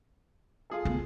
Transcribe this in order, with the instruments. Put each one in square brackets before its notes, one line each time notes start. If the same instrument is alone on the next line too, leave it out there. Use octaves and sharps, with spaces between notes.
[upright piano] F4 G#4 A4
[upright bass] A3 B3